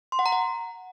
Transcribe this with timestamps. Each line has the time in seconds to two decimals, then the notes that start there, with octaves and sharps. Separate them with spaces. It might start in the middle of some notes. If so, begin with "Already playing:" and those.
0.12 C6
0.19 F#5
0.26 A#5
0.32 F#5